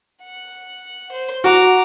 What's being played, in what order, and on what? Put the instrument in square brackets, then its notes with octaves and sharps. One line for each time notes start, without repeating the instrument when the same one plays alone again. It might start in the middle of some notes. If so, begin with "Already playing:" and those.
[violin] F#5
C5
[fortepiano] F#4 [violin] A#5 D6